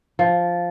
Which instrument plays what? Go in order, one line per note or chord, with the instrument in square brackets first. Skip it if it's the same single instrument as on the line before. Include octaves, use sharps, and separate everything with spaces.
[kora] F3